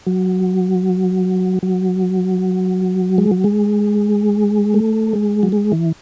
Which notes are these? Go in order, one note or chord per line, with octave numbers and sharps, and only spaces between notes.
F#3
F#3
G#3
F#3
G#3
A3
G#3
F#3
G#3
E3